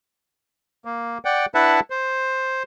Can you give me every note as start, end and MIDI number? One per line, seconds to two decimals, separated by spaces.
0.85 1.18 58
1.25 1.46 74
1.25 1.46 78
1.25 1.46 79
1.55 1.80 62
1.55 1.80 64
1.55 1.80 71
1.55 1.80 76
1.55 1.80 78
1.55 1.80 81
1.90 2.63 72